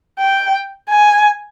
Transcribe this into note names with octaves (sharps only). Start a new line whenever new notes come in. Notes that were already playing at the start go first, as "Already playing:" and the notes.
G5
G#5